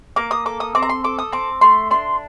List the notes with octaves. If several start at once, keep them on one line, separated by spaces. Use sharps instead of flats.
A#3 D6
D#6
A4 D6
D#6
C4 D6
A#5
C6
A4 D6
D#6
C4 D6
A3 C6
D4 C6